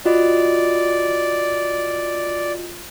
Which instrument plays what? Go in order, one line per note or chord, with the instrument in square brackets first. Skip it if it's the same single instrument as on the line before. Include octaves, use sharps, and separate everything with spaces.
[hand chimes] F4 F#4 D#5 [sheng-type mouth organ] D5